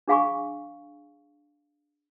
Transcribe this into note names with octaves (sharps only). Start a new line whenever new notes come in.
D4 G#4 F5 G#5 B5 C#6